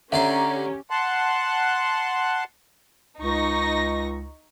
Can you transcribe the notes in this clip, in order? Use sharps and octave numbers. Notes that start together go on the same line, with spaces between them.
D3 C#4 G4 D5 E5 A#5 C6
F#5 A5 C6 F#6
C#2 D#4 C#6 A#6